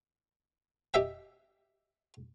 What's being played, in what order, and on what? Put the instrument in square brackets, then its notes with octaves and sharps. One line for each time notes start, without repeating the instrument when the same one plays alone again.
[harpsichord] G4 D#5 E5 G5